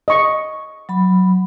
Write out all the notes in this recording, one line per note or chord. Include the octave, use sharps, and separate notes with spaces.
D#5 C#6
F#3 B5